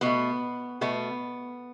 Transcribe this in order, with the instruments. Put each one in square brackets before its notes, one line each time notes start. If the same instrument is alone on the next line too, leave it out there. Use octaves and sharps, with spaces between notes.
[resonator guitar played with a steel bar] B2 A3 B3
B2 A3 B3